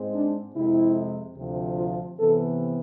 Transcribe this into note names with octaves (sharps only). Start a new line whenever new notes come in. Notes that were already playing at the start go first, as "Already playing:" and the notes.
Already playing: G#2 G#3 C4
D4
F2 C3 G#3 E4
D2 C3 F3
F4
C3 E3 B3 A4